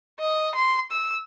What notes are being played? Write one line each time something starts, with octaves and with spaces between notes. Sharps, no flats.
D#5
C6
E6